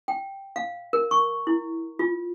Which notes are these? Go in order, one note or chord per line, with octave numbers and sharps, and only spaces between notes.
G5
F5
A#4
C#6
E4
F4